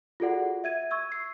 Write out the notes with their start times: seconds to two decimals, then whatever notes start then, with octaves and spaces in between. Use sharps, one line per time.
0.20 F4 F#4 G#4 A4 D5 F#5
0.64 E5 G#6 D#7
0.91 C#6 E6 G#6
1.12 C7